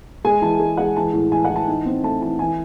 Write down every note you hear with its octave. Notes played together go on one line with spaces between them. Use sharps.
G#3 G#5
E3 A5
G#3
G#3 F#5
E3 A5
A2
E3 G#5
F#5
E3
A5
D#4
C4
A3 A5
E3 A5
E3 G#5